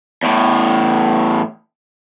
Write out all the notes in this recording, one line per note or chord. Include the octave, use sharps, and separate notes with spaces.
E2 A2